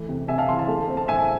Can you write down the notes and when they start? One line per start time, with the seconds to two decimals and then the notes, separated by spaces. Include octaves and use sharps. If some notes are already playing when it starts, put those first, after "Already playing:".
Already playing: E3 A3
0.09 C3
0.28 C3 E5 G#5
0.38 F5 A5
0.48 E3 A5 C6
0.59 F5 A5
0.68 A3
0.88 C4
0.97 A5
1.08 A2 E5 G#5